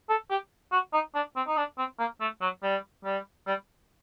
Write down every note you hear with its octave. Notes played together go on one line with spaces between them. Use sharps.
A4
G4
F#4
D#4
D4
C4
D#4
D4
C4
A#3
A3
F#3
G3
G3
G3